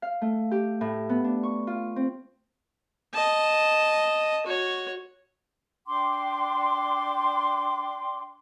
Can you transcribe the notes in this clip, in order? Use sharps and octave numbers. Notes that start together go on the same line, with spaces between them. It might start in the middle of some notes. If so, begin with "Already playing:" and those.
F5
A3
G4
A2
B3
D4
C#6
F4
C4
D#5 A5
F#4 C#5
D4 G5 C6 D6